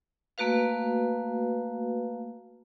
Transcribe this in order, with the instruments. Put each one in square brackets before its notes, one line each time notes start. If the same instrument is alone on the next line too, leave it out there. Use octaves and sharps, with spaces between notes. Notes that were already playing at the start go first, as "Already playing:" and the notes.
[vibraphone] A3 A#3 F#4 B4 F5